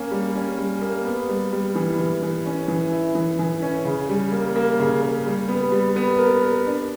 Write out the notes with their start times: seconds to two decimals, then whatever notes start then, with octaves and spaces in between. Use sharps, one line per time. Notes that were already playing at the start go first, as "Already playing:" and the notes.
Already playing: A#3 C#4
0.11 G3
0.35 C#4
0.58 G3
0.82 A#3
1.05 B3
1.29 G3
1.53 G3
1.75 E3
1.99 E3
2.22 E3
2.46 C#4
2.68 E3
2.92 E4
3.15 E3
3.39 E3
3.62 C#4
3.85 C#3
4.09 G3
4.32 A#3
4.56 A#3
4.79 C#3
5.02 A#3
5.26 G3
5.48 B3
5.72 G3
5.96 B3
6.18 A#4
6.42 A#4
6.66 D4